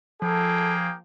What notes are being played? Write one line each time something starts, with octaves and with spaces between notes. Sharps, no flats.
F3 A#3 G#4 A4 G5